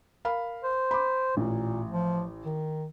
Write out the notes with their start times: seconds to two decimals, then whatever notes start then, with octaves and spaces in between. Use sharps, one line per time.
0.25 A#4 F5 B5
0.63 C5
0.91 B5 D6
1.37 A1 A#2
1.89 F3
2.45 D#3